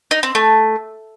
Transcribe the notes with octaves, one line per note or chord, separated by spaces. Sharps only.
D#4
C4
A3